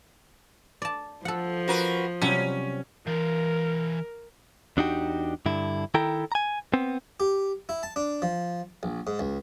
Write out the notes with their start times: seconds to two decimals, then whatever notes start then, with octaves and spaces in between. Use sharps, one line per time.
0.82 D5 A5
1.25 F3 A4 F#5
1.68 F#4 A#4 B4
2.21 C3 F#3 G3 C#4
3.07 E3 A#4 F5
4.77 E2 D4 D#4 F#4 G4
5.46 G2 D3 E4
5.94 D#3 E4 A4 G5 A#5
6.32 G#5 A#5
6.73 B3 C4
7.20 G4
7.69 E4
7.83 A5
7.96 D4
8.22 F3
8.83 A#1
9.07 G#2
9.19 C#2